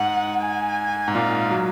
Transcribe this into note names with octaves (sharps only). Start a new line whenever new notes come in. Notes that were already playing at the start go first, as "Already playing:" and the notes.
Already playing: G#2 F#5
G#5
G#2
A#2 F5
F#3